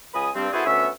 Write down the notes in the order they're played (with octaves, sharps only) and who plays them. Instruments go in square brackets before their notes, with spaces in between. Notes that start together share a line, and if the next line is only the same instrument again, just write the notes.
[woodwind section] C#2 G#5 B5 D#6
G2 C4
B3 E4 F#4 G#4 A4 C5
D2 B3 C#4 E5